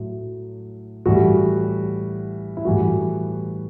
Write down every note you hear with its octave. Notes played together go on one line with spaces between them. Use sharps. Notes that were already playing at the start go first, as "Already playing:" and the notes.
Already playing: A2 F#3 A3
A2 E3 G3 F#4
E4
A2 E3 G3 F#4